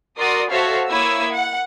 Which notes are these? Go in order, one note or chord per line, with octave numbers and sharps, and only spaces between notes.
F#4 A#4 D5 C6 D#6
F#4 A4 C5 C#5 E5 F5
A#3 E4 C#5 D#6 E6 G#6
F#5